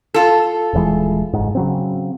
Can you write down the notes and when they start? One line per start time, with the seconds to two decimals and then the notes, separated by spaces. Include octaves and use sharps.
0.14 F4 A4
0.73 D#1 E3 G#3
1.33 F#1 G#2
1.55 C#3 F#3 C4